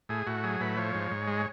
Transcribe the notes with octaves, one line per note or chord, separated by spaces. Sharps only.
A2 G#4
A2 F#4
F#3 G#4
A2 B4
F3 C#5
G#2
G#2
G#3